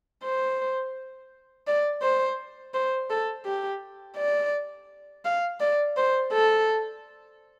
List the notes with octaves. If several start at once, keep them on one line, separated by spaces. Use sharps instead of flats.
C5
D5
C5
C5
A4
G4
D5
F5
D5
C5
A4